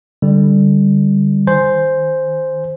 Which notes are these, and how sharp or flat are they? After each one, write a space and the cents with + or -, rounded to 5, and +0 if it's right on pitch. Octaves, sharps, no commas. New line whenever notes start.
D3 +0 G3 +5
D#3 -5 C5 +0 G#5 +0